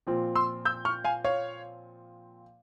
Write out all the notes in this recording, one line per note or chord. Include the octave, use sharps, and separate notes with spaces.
A#2 F3 C4 F4
C6 E6
E6 G6
C#6 F6
F5 G#5
C#5 F5